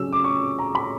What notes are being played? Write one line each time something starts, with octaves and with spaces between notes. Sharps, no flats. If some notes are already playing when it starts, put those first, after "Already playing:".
Already playing: C#3 F#3 C#4 E6
D6
C#6
A#5
B5